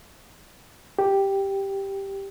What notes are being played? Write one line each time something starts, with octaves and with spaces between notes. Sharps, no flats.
G4